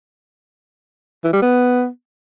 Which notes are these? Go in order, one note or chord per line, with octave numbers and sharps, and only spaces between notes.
E3
G3
B3